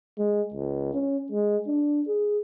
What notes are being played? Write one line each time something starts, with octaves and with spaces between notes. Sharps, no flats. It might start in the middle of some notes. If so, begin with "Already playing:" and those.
G#3
C#2
C#4
G#3
D4
G#4